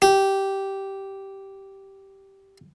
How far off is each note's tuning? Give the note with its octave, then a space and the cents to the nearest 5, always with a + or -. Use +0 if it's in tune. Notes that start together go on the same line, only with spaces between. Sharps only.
G4 -10